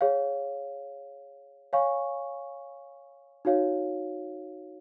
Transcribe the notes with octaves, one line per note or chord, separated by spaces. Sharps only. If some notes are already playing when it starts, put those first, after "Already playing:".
G#4 C#5 F5
C#5 F5 G#5 C#6
D#4 F#4 C#5 F5